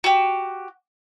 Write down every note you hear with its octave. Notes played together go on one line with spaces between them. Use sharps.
F#4 G4